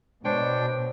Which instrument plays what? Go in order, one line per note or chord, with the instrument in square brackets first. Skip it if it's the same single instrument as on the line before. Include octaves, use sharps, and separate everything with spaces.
[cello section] B2 [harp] G#3 C5 C#5 [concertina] D4 G5